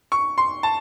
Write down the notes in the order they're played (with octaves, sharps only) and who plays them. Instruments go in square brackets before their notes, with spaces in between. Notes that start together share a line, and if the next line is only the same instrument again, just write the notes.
[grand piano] C#6
C6
A5